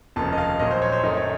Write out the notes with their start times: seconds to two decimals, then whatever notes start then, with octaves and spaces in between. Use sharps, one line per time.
0.16 F1 D#2 C#3 F3 A5
0.33 D#5
0.38 F5
0.59 A#1 A#2 F#3 D#5
0.71 C5
0.82 C#5
0.92 C5
1.03 F#2 D#3 A3 D#4
1.17 C#5